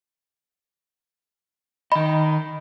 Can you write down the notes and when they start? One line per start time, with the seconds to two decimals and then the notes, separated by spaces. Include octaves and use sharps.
1.92 D#3 D#5 B5